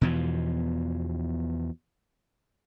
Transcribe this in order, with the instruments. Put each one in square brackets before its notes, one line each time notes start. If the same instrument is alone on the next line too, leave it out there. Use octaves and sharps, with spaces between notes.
[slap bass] E2 B2 E3 F3